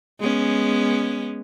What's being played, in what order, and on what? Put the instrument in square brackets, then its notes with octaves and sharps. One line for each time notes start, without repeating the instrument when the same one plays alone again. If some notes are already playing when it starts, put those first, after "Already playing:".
[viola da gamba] G#3 B3 C#4